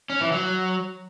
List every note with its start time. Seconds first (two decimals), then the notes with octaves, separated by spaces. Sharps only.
0.10 C#4
0.21 E3
0.32 F#3